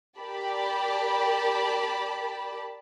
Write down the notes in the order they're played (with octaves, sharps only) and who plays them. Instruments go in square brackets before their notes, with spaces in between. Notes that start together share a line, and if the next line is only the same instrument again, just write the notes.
[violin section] G4 A#4 D5 A5 B5